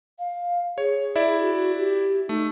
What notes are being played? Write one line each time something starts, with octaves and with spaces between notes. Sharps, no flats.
F5
G#4 C#5
E4 D5 E5
F#4
G4
A3 D#4